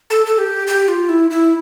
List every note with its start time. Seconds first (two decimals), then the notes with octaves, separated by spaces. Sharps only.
0.10 A4
0.26 A4
0.38 G4
0.67 G4
0.88 F4
1.09 E4
1.30 E4